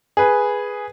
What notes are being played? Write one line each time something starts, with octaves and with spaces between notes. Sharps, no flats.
G#4 B4